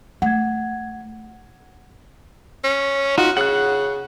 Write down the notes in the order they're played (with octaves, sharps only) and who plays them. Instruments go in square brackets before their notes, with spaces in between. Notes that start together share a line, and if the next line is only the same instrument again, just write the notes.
[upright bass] A3 [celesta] F#5 G#6
[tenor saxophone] C#4
[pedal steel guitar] D#4 F4 [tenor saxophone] F#4
[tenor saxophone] C#3 [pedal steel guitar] F#5 F#6